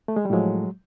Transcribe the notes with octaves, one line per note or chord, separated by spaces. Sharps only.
A3
G#3
G3
A2 F3 F#3 G#3